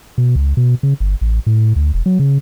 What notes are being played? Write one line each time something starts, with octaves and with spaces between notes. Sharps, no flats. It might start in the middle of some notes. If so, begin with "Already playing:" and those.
B2
C#2
B2
C#3
G1
A1
A2
D2
E1
F#3
C#3